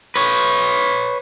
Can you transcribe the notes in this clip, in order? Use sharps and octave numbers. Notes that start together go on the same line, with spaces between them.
B4 C#5